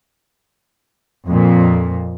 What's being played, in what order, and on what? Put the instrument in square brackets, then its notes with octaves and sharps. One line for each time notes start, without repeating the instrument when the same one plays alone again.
[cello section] F2 A#2